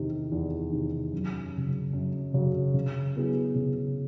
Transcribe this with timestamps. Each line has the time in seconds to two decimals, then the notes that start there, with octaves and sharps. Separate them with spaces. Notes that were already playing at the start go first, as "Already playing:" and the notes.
Already playing: E2 C3 D#3
0.32 E2
0.71 C3 D#3
1.12 F#2
1.54 C#3 F#3
1.93 F#2
2.34 C#3 F#3
2.74 C#3
3.16 F#3 B3 E4 G#4
3.55 C#3